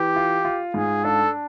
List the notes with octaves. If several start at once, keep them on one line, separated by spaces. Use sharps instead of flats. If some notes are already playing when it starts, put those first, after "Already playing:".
Already playing: E3 G4
F4
F4
G#2 G#4
D4 A4